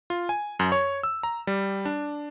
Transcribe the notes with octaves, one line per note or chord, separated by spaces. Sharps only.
F4
G#5
F#2
C#5
E6
A#5
G3
D4